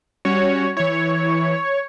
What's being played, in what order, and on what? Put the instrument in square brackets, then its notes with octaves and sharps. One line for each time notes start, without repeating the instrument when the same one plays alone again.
[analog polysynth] G3 C#4 F#4 [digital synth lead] C#5
[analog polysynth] E3 E4 [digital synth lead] C#5